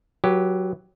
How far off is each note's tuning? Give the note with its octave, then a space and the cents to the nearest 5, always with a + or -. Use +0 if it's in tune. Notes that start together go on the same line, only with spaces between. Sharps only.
F#3 +0 G4 -5 B4 -35